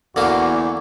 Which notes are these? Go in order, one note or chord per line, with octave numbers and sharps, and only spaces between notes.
E2 D3 A#3 F#4